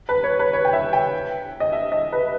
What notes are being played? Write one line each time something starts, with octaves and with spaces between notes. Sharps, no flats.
B4
C#5
B4
C#5
G5
E5
G5
D#5
E5
D#5
B4